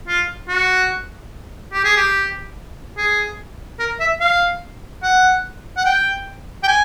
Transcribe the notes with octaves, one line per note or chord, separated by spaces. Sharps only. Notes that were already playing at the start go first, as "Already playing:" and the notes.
F4
F#4
G4
G#4
G4
G#4
A#4
E5
F5
F#5
F#5
G5
G5
G#5